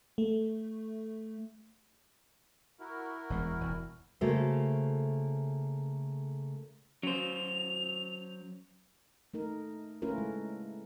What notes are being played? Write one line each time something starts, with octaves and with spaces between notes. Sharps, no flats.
A3
E4 F#4 A#4
E1 E2 G#3
E1
C#3 A3 A#3 F#4 A4 C5
F#3 C#4 C5 F7
A3 D#4 A#4
A3 C#4 E4 F4 A#4 B4
G#3